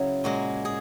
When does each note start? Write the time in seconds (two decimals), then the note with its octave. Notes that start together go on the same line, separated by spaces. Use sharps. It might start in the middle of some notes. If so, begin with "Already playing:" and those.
Already playing: C#3 F#3 E4
0.24 A#2 G#3 F#4
0.65 G#4